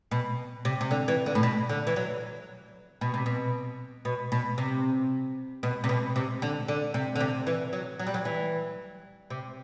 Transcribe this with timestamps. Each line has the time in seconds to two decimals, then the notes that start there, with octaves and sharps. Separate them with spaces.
0.11 B2
0.65 C3
0.81 C3
0.91 D3
1.08 E3
1.26 D3
1.35 A2
1.43 B2
1.69 D3
1.87 E3
1.96 F#3
3.01 B2
3.14 C3
3.26 B2
4.05 B2
4.32 B2
4.58 C3
5.63 B2
5.84 C3
5.89 B2
6.16 C3
6.42 D3
6.68 D3
6.94 C3
7.16 D3
7.20 C3
7.47 E3
7.73 F#3
8.00 F#3
8.07 G3
8.14 F#3
8.25 E3
9.30 C3